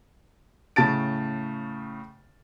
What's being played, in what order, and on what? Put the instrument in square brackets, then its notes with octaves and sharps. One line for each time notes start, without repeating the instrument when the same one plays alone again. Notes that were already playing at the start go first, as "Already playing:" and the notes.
[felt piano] A2 C#3 A5 A6 D7